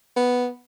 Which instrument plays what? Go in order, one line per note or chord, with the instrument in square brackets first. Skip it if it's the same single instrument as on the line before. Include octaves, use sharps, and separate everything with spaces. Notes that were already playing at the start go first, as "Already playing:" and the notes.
[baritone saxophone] B3